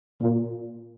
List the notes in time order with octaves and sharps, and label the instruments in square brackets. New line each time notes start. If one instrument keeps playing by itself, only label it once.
[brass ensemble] A#2